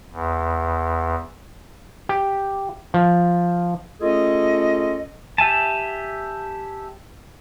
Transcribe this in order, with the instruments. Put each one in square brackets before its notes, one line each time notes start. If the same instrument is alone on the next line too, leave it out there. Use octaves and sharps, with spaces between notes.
[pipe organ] E2
[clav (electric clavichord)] G4
F3
[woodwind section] A3 C#4 F4 G#4 A4 D#5
[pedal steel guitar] G4 E5 G#5 A5